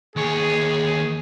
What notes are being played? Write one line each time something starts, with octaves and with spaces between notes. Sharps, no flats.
D#2 G#4 C#5